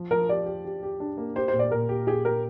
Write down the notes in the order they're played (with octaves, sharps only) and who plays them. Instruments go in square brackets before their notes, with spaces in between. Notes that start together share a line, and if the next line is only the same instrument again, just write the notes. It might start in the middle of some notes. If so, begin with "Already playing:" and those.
Already playing: [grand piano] F3
[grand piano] F3 [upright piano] A#4
[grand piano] G4 [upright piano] D5
[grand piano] G4
G4
G4
D4
A#3
[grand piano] G4 [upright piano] C5
[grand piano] A#2 [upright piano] C5
[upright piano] D5
[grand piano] A#2 [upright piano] A#4
[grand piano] G4
[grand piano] G4 [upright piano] G#4
[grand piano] G4 [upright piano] A#4